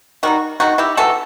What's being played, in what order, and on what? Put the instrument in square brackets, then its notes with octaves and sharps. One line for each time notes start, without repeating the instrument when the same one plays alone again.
[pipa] D#3 G3 D#4 F#4
D#3 G3 D#4 F#4
E4 G4
C3 E3 A3 F#4 A4